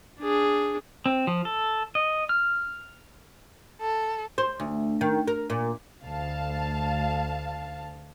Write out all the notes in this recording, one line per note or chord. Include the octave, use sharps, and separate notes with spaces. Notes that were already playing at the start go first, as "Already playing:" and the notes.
D4 G#4
C4
F3
A4
D#5
F6
A4
C5
D2
D#3
A#4
A#2
D2 F5 A5